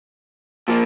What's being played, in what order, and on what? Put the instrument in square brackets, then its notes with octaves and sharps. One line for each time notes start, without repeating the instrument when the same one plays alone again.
[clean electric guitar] A#2 F3 A#3